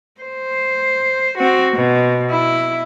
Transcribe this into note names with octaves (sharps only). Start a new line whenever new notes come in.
C5
C4 F#4
B2
E4